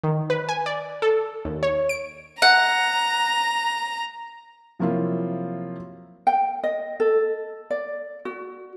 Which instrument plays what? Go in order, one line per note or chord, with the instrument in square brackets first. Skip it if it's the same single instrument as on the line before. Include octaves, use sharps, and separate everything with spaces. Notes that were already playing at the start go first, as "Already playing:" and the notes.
[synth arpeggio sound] D#3
B4
G#5
D5
A4
D#2
C#5
D7
[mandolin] F#5 [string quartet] A#5
[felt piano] C3 F3 F#3 A#3 E4 F4
[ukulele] G5
D#5
A4
D5
F#4